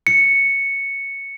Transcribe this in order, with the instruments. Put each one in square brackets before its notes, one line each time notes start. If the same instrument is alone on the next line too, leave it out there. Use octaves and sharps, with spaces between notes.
[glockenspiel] C#7